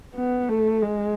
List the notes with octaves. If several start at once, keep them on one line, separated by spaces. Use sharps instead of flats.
B3
A3
G#3